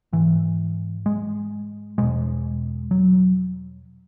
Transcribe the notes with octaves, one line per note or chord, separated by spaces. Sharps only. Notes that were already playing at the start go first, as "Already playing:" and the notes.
G#2 E3
G#3
E2 B2 G#3
F#3